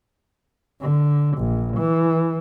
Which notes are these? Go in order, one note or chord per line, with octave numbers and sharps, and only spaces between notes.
D3
A#1
E3